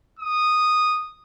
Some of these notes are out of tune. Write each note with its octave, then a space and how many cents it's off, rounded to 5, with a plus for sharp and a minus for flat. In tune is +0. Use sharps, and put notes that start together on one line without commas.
D#6 -10